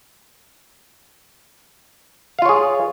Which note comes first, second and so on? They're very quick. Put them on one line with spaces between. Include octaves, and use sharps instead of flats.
F5 F4 C#5 G#4